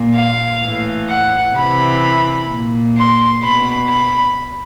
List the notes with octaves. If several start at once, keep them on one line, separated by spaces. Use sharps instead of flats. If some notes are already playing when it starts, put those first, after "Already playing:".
Already playing: A#2
F5
A2 E3
F#5
C3 E3 B5
A#2
C6
B2 B5
B5